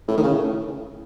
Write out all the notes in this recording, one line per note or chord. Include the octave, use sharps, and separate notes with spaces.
A2
D#3
C#3
A2